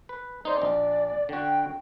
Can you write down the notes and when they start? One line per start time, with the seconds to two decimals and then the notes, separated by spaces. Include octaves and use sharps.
0.09 B4
0.45 D#4 C5 D5
0.62 A#1
1.29 D3 F#4 G5